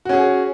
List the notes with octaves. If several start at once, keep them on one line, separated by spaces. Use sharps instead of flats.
C#4 F#4 G#4